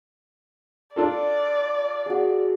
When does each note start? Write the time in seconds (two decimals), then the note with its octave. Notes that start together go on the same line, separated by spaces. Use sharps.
0.96 D4 F4 A4 D5
2.06 F#4 G#4